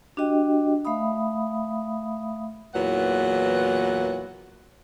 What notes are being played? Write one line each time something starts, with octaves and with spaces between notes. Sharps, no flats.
D4 F#4 G4 D#5 G5
A3 E5 F5 B5 D#6
E2 A#2 E3 F#3 B4 F#5